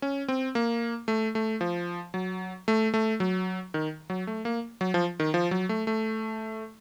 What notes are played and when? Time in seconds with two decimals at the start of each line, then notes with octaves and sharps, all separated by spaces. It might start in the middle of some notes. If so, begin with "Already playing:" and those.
0.02 C#4
0.28 C4
0.55 A#3
1.08 A3
1.35 A3
1.61 F3
2.14 F#3
2.68 A3
2.94 A3
3.20 F#3
3.74 D#3
4.10 F#3
4.27 A3
4.45 A#3
4.81 F#3
4.94 F3
5.20 D#3
5.34 F3
5.51 F#3
5.69 A3
5.87 A3